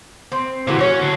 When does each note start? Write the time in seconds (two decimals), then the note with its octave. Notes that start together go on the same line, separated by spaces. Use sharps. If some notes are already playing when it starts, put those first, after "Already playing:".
0.32 C4
0.67 A#2 D3 E3 F#3
0.79 C#4 F#4 C#5
1.01 D3 F#3